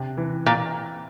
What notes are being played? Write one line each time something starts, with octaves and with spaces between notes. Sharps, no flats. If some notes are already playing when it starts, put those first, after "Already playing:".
Already playing: C3 D4
E3
A#2